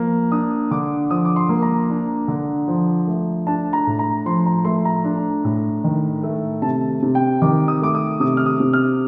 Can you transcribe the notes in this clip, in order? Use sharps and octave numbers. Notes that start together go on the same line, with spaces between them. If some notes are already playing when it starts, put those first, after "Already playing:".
Already playing: F3 A#3
D4 D#6
D3 D6
F3 D#6
D6
C6
A#3
A#5
D4
D3
F3
A3
D4 A5
A#5
A2
A#5
F3 C6
A#5
A3 C6
A#5
D4
A2
D#3
A3
C3 A5
C3
G5
D#3 D6
D#6
A3 D6
D#6
C3 D#6
F6
D#6
C3
F6